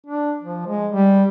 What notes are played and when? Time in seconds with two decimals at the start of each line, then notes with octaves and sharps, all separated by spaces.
0.07 D4
0.42 F3
0.67 G#3
0.92 G3